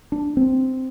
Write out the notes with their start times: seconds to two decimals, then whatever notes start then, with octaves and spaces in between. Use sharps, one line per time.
0.12 D4
0.37 C4